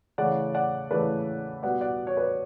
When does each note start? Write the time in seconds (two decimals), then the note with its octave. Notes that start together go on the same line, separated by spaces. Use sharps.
0.18 C#3 E3 A3 D5 F#5
0.55 D5 F#5
0.91 C#3 E3 A3 B4 D5
1.63 B2 G3 B3 D5 F#5
1.81 D5 F#5
2.07 C#5
2.17 B4 D5